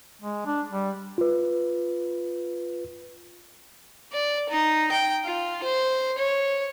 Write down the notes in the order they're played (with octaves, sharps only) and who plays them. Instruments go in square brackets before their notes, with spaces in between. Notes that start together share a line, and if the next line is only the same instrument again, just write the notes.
[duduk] G#3
D4
G3
[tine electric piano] F4 B4
[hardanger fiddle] D5
D#4
G5
F4
C5
C#5